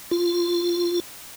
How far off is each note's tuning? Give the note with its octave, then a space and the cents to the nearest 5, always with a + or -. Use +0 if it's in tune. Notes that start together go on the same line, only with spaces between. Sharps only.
F4 -5